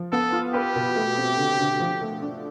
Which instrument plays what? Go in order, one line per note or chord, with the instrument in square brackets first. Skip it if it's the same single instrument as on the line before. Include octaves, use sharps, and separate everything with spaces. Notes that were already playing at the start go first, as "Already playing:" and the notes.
Already playing: [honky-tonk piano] F3
[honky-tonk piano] B3 [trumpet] A4
[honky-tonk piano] F4
[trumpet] G4 [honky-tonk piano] B4
[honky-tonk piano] B2
A3
C4
D3
D3
F3
A3
D4